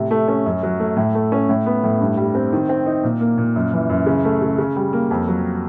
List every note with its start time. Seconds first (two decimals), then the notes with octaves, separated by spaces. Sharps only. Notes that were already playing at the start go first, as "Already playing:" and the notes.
Already playing: A2 C3
0.11 A3
0.28 C#4
0.46 F#2
0.63 F#3
0.80 A3
0.97 A2
1.15 A3
1.32 C#4
1.49 A2
1.66 B3
1.84 A2
2.01 G2
2.17 G3
2.35 C4
2.52 D#3
2.69 C4
2.86 D#4
3.04 A#2
3.21 A#3
3.38 A#2
3.56 F#2
3.73 E3
3.90 F#2
4.06 C#3
4.25 A3
4.42 C#3
4.58 C#3
4.76 G3
4.93 A#3
5.11 F2
5.28 F#3